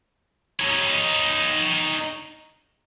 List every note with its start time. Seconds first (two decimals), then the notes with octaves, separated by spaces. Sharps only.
0.60 D#4 C#5